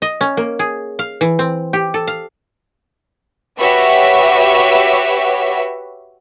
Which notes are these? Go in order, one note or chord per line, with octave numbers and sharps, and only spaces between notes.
D#5
C#4
A#3
G#4
F5
E3
C4
G4
A4
F5
F#4 G4 B4 C#5 E5